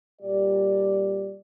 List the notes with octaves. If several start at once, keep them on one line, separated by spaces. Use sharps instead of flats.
A#2 G3 G4 D5